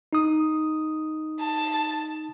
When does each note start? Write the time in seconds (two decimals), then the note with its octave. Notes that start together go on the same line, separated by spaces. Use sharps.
0.13 D#4 D#6
1.40 A5